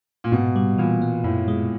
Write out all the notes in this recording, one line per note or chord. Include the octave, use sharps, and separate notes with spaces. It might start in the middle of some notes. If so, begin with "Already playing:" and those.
A#2
G#2 B2
G3
A#2 E3
B3
F#2 A2
G#3